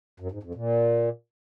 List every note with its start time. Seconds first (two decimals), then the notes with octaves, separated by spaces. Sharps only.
0.20 F#2
0.32 G#2
0.43 F2
0.55 A#2